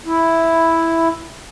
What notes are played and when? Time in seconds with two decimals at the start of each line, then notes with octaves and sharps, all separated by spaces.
0.06 E4